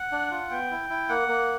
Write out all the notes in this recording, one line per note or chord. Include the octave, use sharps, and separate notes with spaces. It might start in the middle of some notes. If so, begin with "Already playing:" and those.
Already playing: F#5
D4
F4
B3 G5
E4
E4
A#3 F#5
A#3